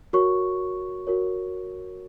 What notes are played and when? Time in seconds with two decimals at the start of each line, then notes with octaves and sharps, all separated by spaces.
0.13 F#4 A#4 C#5 C#6
1.07 F#4 A#4 C#5